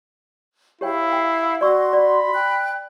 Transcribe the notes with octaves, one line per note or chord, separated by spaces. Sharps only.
E4 G4 C#5 F5 G5
G5
F#4 D5 C6 C#6 E6
D5 B5
G5 F#6